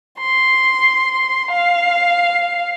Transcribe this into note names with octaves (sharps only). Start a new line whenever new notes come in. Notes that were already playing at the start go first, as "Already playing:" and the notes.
C6
F5